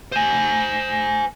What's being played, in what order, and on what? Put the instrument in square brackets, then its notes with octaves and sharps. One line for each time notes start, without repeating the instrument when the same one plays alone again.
[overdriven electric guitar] C5 G#5